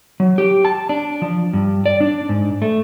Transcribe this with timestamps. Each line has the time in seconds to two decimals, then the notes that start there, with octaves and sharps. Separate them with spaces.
0.20 F#3
0.38 G4
0.65 A5
0.89 D4
1.22 F3
1.53 G2
1.86 D5
2.00 D4
2.29 G#2
2.62 A3